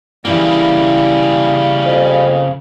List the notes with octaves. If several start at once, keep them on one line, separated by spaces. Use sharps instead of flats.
C#3 E3 G3 A#3 E4 G5
F2